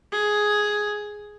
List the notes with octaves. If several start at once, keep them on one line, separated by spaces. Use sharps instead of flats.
G#4